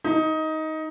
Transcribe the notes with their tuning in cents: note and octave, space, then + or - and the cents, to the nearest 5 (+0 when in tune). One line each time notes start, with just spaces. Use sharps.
D#4 +15